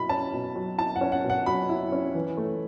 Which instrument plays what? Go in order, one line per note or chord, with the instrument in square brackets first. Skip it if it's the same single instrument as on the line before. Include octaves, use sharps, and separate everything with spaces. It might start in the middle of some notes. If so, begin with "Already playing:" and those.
Already playing: [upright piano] B2 F#3 E4 B5
C#4 A5
B2
F#3
E4 A5
F#5
C#4
F#5
B2
F#5
F#3 B5
E4
C#4
E3
A3